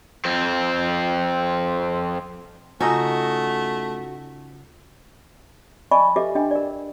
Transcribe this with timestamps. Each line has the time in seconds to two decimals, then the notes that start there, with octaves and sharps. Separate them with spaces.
0.25 F2 C4
2.80 C#3 A3 C#4 D#4 F4 F#4 D#5 E6
5.91 D5 D#5 G#5 A5 B5 C#6
6.16 G4 A4 B4 D#5 E5 D6
6.35 D4 D#5 G5
6.51 A#4 D5